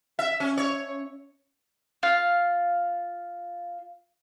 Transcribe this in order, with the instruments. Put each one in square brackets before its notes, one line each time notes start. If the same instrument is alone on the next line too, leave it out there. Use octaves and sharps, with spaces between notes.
[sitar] E5
C#4
C#5
[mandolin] F4 F5